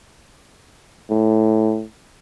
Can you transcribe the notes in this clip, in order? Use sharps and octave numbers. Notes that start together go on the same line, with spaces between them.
A2